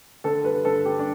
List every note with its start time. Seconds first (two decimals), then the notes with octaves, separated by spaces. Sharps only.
0.24 D3 A4
0.44 G2 B4
0.65 D3 A4
0.85 G3 G4
0.99 D4